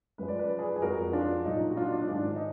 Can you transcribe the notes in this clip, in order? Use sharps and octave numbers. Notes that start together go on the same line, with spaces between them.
F#2 F3 G#3 B4
D5
B4
D5
G#4 B4
G#4
F2 F3 G#3 F#4 A#4
D4 F4
A#2 F#3 D#4
F#4
D4 F4
D4
G#2 D#3 G#3 D4
D#4